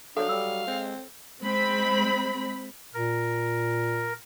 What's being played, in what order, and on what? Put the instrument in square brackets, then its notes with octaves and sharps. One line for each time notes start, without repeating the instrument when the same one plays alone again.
[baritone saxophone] F#3 [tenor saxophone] D4 [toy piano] A4 C#5 [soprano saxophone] F5
[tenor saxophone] G3 [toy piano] E6
[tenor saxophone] G#3 [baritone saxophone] C4
[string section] G#3 C4 B5
[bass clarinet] A#2 [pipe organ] A#4